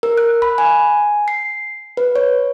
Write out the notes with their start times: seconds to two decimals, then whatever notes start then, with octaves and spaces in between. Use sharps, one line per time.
0.03 A#4
0.17 F#6
0.42 B5
0.58 G#5
1.28 C7
1.97 B4
2.16 C#5